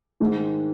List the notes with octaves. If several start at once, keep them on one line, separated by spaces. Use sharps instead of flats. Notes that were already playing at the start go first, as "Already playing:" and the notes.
G#2 D#3 G#3